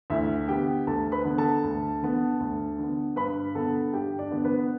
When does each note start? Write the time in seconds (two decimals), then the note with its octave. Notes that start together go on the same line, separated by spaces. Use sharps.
0.10 D2 E4 E5
0.48 D3 B3 G4 G5
0.87 D2 A4 A5
1.12 B4 B5
1.25 D3 B3
1.38 A4 A5
1.63 D2
2.02 D3 B3
2.40 D2
2.78 D3 B3
3.16 G2 B4 B5
3.55 D3 B3 A4 A5
3.93 G2 G4 G5
4.19 D4 D5
4.32 D3 B3
4.44 B3 B4